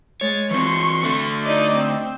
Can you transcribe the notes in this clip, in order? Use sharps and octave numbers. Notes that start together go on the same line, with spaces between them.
G#3 C#5 A6
E3 C4 C6 C#6
D3 A3
D#4 D5 D#5
C4